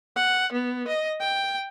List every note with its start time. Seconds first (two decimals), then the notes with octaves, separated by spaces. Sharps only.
0.16 F#5
0.52 B3
0.87 D#5
1.20 G5